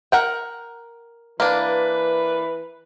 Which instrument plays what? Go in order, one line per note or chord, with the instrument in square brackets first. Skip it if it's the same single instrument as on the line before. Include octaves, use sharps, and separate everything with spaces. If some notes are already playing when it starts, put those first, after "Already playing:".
[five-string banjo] A#4 F#5 G5
[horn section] E3 B4 [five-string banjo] A#3 D4